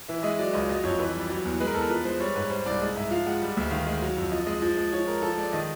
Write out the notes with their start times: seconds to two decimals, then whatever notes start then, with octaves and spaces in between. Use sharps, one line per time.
0.08 E3 E5
0.19 E5
0.23 G#3 D#5
0.39 F#3 D5
0.53 C#2 D#5
0.68 F#3 D#5
0.84 F2 C#5
0.99 E3 B4
1.15 G3
1.30 F#3
1.45 E2
1.60 G#3 B4
1.67 A#4
1.74 E2 A4
1.82 A#4
1.90 F3 B4
2.05 G#3 C5
2.20 G3 C#5
2.35 G#2 B4
2.50 G3 C5
2.66 C2 D5
2.81 G#3
2.96 G#2 E5
3.10 F3 F5
3.26 G#3 F#5
3.42 G3
3.57 D2
3.71 D#3 F5
3.87 G#3
4.02 F#3
4.17 F2
4.32 F3 D#5
4.47 G#3 D#5
4.62 F3
4.77 G#3
4.92 F3 C#5
5.08 G#3 A#4
5.22 F3 A4
5.37 G#3 D5
5.53 D#3 D#5